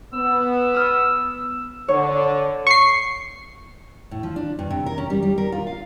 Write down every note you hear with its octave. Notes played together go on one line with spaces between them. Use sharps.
B3 E6
D#6 F6
D3 C#5
C#6 C7
A2
F3
D4
G2
C3
A#4
C#4
G3
G3
A#4
F4
F5